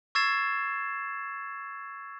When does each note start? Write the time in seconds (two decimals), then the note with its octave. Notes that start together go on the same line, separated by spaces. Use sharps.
0.15 C#6 E6 G#6 A6 C7 E7